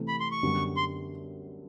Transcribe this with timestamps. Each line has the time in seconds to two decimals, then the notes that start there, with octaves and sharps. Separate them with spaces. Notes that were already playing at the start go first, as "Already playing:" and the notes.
Already playing: C3 E3 A3
0.08 B5
0.20 C6
0.32 C#6
0.43 F#2 D3 G3 B3
0.76 C6